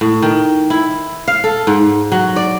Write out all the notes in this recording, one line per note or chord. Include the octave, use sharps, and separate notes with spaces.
A2
D#3
E4
F5
A4
G#2
F#3
D5